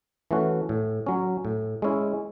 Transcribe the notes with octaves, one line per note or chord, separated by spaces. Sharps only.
E3 A3 C#4 F#4
A2
F#3 C#4
A2
G#3 C#4 E4